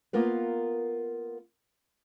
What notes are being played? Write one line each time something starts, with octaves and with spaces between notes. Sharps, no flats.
A#3 B3 F4 A#4 B4